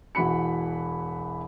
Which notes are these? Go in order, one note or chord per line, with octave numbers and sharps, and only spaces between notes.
E1 E3 F#4 B5 C#7